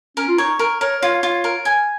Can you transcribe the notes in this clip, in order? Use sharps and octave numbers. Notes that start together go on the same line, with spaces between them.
C#4 A#4
F4
D#4 C#5
A#4
A#4 C#5
F4 C#5
F4
A#4
G#5